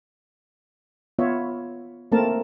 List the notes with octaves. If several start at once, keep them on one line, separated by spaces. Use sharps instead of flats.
B3 F4 C#5 E5
A3 A#3 C4 A#4 A5